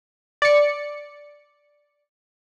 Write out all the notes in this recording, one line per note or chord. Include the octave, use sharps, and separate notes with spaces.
D5 C#7